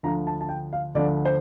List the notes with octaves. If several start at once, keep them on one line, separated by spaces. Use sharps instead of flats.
D2 D3 F3 A#5
A5
A5
G5
F5
D2 D3 F3 D5
C5